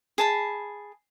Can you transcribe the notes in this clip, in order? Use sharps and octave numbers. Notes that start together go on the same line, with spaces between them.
G#4 A5 B5